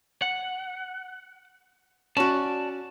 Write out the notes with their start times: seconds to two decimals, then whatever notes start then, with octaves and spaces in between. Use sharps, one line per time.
0.22 F#5
2.17 C#4 F#4 D5 A5